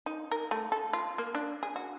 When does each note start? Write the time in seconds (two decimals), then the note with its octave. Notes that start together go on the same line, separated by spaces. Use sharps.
0.06 D#4
0.31 A#4
0.51 A3
0.72 A4
0.93 F4
1.18 A#3
1.35 D4
1.63 G#4
1.76 F#4